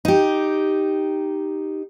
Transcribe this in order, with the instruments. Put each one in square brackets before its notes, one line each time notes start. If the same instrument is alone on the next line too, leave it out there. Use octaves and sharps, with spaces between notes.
[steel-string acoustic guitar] D#4 G4